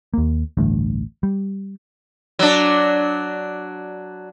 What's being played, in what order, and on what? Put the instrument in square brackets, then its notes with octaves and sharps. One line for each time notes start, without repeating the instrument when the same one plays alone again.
[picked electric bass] D#2 A#3
A1 D2 G2
G3
[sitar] F#3 D4